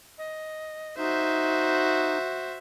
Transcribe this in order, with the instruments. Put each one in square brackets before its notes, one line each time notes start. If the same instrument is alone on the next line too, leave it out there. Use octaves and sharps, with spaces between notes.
[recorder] D#5
[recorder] D#4 [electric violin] F#4 C5 [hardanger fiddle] E5